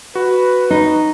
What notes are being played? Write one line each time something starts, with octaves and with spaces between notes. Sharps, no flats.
F#4 B4
D#4